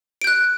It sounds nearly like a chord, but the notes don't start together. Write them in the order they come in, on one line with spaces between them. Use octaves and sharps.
D7 G6 F#6